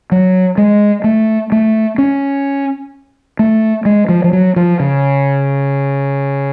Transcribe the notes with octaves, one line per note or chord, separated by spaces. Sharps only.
F#3
G#3
A3
A3
C#4
A3
G#3
F3
F3
F#3
F3
C#3